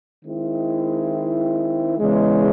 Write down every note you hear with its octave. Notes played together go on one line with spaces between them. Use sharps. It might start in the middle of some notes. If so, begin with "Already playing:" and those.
D#3 G#3 C4 E4
E2 C#3 E3 G#3